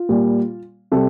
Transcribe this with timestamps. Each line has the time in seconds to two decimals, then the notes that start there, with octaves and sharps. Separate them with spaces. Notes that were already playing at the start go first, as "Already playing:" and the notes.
Already playing: F4
0.09 A#2 G3 A#3
0.92 C3 G3 A4